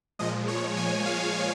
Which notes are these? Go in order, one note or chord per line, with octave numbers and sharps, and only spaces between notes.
A#2 F3 G#3 D#5
C#5
G#5
F5